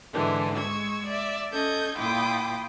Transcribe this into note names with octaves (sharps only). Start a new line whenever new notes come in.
G#2 D3 E3 G#3 D4
G#3 C#6 E6 G#6
D5 E5
C#4 A4 D#5 G6 G#6
A#2 E4 F4 G5 D6 D#6